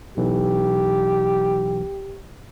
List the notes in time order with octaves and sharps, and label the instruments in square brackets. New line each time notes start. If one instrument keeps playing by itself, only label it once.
[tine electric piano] B1 E3 [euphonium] G4